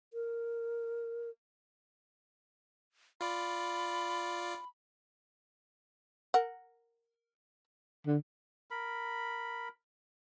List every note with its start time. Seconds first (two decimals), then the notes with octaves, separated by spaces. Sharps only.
0.13 A#4
3.21 F4 D5 B5
6.34 A#4 F#5
8.06 D3
8.71 A#4 B5